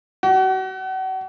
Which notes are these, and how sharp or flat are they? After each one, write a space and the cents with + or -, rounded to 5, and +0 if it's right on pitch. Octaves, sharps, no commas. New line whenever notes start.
F#4 +35